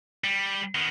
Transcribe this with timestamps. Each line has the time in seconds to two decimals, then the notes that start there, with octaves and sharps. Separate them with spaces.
0.24 G3
0.75 D#3 B3